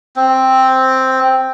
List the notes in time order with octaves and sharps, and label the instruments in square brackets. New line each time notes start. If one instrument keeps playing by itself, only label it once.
[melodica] C4